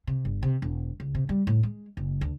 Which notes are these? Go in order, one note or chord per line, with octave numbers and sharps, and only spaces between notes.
C3
G1
C3
E1
C#2
C3
G3
A2
G#3
F#1
D2